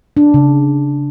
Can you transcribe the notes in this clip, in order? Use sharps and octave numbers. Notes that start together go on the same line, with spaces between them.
D4
C#3